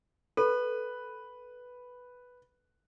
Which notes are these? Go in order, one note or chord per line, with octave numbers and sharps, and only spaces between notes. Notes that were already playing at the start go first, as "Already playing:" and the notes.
A4 B4